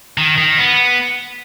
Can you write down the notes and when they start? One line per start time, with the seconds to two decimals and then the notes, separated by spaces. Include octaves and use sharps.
0.18 D#3
0.38 D#3
0.58 B3